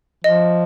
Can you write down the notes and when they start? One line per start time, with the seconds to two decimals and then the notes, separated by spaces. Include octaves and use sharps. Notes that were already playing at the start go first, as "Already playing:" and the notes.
0.24 F3 D#5